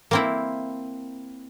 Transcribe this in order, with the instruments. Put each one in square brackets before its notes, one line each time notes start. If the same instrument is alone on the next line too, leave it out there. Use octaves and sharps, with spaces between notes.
[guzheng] A#3 C4 E4